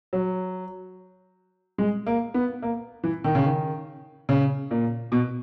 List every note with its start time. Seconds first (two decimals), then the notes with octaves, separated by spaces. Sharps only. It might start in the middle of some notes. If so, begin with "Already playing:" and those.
0.13 F#3
1.78 G#3
2.06 A#3
2.34 B3
2.62 A#3
3.04 E3
3.24 D#3
3.35 C#3
3.44 D#3
4.29 C#3
4.71 A#2
5.12 B2